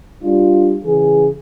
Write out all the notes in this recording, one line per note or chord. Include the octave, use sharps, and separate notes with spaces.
G3 D4 F4
C#3 E3 G#4